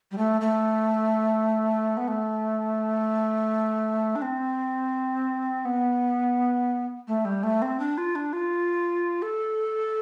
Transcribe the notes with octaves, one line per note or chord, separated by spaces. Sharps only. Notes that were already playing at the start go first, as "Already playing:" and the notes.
G3
A3
A3
B3
A3
D4
C4
B3
A3
G3
A3
C4
D4
F4
D4
F4
A4